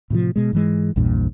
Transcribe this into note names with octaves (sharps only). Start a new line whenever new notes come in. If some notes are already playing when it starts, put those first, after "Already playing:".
A2 C3 D#3 F3
B2 G#3
G#2 E3 G#3
A#1 E2 G2 A#2